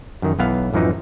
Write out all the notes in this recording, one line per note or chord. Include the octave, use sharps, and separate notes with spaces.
F#2 D#3
B1 E3 B3 F5
A1 F#2 E3 F3 D#4